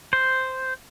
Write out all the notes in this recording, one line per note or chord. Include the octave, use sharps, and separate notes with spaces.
C5